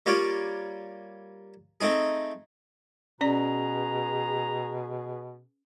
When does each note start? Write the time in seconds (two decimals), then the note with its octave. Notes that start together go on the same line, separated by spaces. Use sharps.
0.06 G3 A#3 F4 C#5 D5
1.81 A3 C4 D#4 G#4
3.21 B2 C#4 G#4 B4 D5 A#5